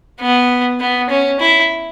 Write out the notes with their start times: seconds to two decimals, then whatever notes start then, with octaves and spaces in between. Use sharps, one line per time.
0.21 B3
0.80 B3
1.10 C#4
1.40 E4